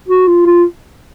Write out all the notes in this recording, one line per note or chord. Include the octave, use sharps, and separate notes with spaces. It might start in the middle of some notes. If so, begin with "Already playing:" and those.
F#4
F4
F4